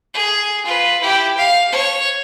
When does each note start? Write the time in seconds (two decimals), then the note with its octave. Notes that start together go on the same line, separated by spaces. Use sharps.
0.14 G#4
0.66 F4 B4
1.01 E4 G4
1.37 F5
1.72 C#5